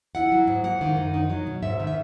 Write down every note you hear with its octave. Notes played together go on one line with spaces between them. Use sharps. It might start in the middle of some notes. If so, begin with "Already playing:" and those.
E4 F#5
F#3
G#2
A#3 F#5
D#3
F#2
D#4
F#3
B2
G#2 E5
D#3
E5